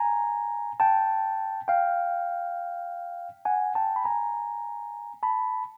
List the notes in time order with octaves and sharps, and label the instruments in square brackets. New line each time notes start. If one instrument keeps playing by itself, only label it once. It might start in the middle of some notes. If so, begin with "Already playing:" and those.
Already playing: [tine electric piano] G#5 A#5
G5 A5
F5 G5
F#5 G#5
G5 A5
B5
G#5 A#5
A5 B5